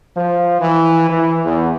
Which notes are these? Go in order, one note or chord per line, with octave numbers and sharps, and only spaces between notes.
F3
E3
E3
E2